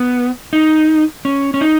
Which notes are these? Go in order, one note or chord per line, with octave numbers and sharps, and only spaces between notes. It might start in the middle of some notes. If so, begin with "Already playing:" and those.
Already playing: B3
D#4
C#4
C#4
D#4